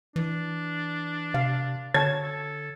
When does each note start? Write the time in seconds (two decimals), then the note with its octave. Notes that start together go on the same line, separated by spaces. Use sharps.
0.16 E3 D4
1.34 C3 F5
1.94 D3 C#5 A5 G#6
2.21 A4